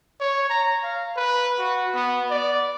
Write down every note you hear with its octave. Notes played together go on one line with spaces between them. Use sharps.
C#5
A#5
F5
B4
F#4
B3
D5